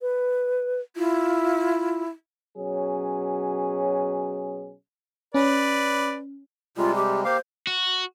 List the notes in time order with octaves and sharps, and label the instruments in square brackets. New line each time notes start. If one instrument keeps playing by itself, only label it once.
[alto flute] B4
[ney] E4 [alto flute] F4
[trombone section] B2 F#3 C#4 G#4
[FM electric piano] C#4 [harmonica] B4 D5
[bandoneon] C3 G3 G#3 [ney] F4
[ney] G4
[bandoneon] A#3 G4 F5 [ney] C5
[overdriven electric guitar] F#4